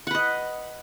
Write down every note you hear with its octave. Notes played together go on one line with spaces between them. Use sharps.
B4 D#5 F#5